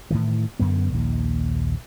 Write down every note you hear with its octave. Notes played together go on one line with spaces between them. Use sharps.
A2 D#3 E3
F#2 D3 B3
A#1 D#2